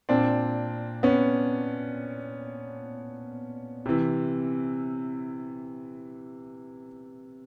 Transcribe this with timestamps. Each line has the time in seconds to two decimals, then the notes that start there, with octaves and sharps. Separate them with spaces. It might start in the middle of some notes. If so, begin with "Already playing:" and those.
0.09 A#2 C4 D4
1.03 B3 C#4
3.86 C3 E3